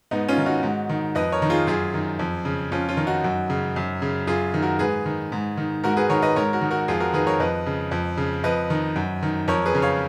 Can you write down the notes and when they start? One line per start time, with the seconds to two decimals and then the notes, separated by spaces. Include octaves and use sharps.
0.11 G#2 B3 D#4
0.28 C#4 F4
0.38 D#3
0.46 D#4 F#4
0.63 G#2
0.89 D#3
1.15 F2 B4 D#5
1.32 A#4 C#5
1.42 D#3
1.50 F4 G#4
1.67 F#2 F4 G#4
1.94 D#3
2.19 F2
2.45 C#3
2.72 F2 C#4 F4
2.89 C#4 F4
2.97 D#3
3.07 D#4 F#4
3.24 F#2
3.50 C#3
3.76 F#2
4.02 C#3
4.27 F#2 F4 G#4
4.54 D#3
4.62 F#4 A#4
4.79 G#2 G#4 B4
5.06 D#3
5.32 G#2
5.57 D#3
5.84 G#2 F#4 A#4
5.97 G#4 B4
6.10 D#3 A#4 C#5
6.22 B4 D#5
6.36 G#2 A#4 C#5
6.53 F#4 A#4
6.61 D#3
6.71 F#4 A#4
6.88 F2 F4 G#4
7.00 F#4 A#4
7.13 D#3 G#4 B4
7.27 A#4 C#5
7.40 F2 B4 D#5
7.66 C#3
7.91 F2
8.17 C#3
8.44 F2 B4 D#5
8.70 D#3
8.96 F#2
9.23 D#3
9.48 F2 A#4 C#5
9.65 G#4 B4
9.75 C#3
9.82 C#5 F5